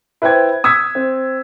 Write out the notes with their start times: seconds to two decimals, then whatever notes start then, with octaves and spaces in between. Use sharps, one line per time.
0.22 E4 B4 C5 G5 G#6
0.64 D#6 E6 G#6 B6
0.95 C4